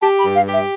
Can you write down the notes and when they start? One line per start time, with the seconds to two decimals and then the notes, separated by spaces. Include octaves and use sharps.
0.02 G4 A5
0.19 B5
0.25 G2
0.35 F5
0.48 G4
0.53 E5